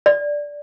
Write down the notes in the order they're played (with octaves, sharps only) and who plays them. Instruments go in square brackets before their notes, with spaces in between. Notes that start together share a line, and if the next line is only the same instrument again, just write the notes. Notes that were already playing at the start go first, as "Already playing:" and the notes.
[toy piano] D5